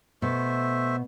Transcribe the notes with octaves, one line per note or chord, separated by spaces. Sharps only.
B2 A3 C5 E5